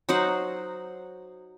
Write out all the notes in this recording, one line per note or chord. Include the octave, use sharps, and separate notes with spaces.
F#3 D#4 C5 F#5